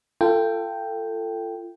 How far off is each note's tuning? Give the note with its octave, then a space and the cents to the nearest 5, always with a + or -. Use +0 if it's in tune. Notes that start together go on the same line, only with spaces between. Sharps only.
F4 -30 A4 +20 G5 +0